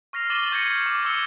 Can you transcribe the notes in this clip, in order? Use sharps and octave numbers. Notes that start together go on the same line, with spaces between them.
C#6 F6 A#6 C7 F7
D6 A6 D#7 E7 F#7 G7
C#6 G6 G#6 A#6 C#7
D6
C#6 D6 E6 G#6 C#7 G7